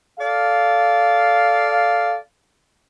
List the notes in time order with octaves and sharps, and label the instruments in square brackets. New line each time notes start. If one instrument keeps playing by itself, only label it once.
[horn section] A4 D5 F5